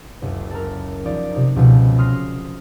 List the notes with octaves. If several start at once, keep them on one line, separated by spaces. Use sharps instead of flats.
F#1 C#2
A4 A#4
F3 D#4 D5
C3 D#4
C#2 B2 F3
C6 D#6 F6 A#6 C7